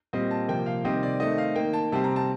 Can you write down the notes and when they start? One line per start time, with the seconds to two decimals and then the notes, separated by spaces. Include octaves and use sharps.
0.13 A#2 G3 C4 D#5
0.31 A5
0.48 C3 F3 A#3 G5
0.66 F5
0.84 C3 D#3 G3 C4 D#5
1.03 D5
1.20 D#3 A3 C4 D#5
1.38 F5
1.56 D#3 A#3 G5
1.73 A5
1.92 C3 G3 C4 A5
2.04 A#5
2.16 A5